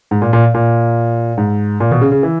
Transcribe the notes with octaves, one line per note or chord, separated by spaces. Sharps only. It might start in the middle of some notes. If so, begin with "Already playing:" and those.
G#2
A#2
A#2
A#2
G#2
A#2
B2
C#3
C#3
E3